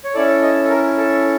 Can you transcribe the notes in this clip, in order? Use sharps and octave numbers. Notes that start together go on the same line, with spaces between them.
C#5
C#4 E4 A4 D5
D#5
A4
A#4
A4